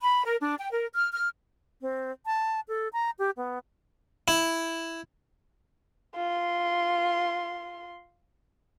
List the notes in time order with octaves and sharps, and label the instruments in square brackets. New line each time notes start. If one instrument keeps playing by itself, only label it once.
[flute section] B5
A#4
D4
G5
A#4
F6
F6
[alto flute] C4
A5
A4
A#5
G4
B3
[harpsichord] E4
[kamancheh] F4 C6